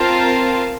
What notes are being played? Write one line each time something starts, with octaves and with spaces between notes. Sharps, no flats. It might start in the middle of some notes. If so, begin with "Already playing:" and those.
Already playing: C4 F4 A#4 F5 A5